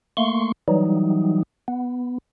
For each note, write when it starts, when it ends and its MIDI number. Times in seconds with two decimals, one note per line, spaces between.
0.17 0.52 57
0.17 0.52 58
0.17 0.52 84
0.17 0.52 85
0.68 1.43 52
0.68 1.43 54
0.68 1.43 55
0.68 1.43 63
1.68 2.18 59